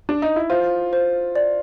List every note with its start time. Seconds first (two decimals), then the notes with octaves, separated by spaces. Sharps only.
0.09 D4
0.22 D#4
0.36 E4
0.50 F4 C5
0.93 C5
1.35 D5